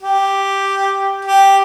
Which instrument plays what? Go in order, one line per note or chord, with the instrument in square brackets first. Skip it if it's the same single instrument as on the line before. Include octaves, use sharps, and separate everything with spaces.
[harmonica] G4
G4